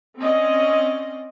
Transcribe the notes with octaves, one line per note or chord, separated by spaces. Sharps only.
C4 C#4 D5 D#5